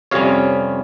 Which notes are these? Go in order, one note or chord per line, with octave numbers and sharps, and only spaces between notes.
F2 C3 G3 C#4 C#5 F5